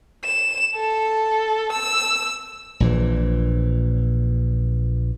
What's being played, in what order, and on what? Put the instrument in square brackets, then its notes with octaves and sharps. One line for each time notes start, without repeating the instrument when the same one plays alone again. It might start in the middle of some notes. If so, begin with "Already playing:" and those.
[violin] E7
A4
E6
[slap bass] A#1 A#2 E3